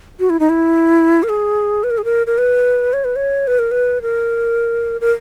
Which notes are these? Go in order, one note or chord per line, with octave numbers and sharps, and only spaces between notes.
F#4
E4
D#4
E4
A#4
G#4
B4
A#4
G#4
A#4
A#4
B4
C#5
B4
C#5
B4
A#4
B4
A#4
A#4